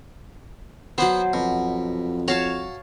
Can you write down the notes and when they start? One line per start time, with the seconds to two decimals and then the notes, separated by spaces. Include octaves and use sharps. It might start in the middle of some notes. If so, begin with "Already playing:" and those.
0.98 F#3 B3 C5 F#5
1.33 F2 B2
2.28 F#4 C#5 F5 A5